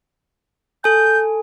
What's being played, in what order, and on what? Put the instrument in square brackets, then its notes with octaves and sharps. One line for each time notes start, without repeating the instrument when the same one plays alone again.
[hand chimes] A4 G#5 [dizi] G6